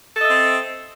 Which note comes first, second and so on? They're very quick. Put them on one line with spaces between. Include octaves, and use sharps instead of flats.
A4 D#5 E5 C4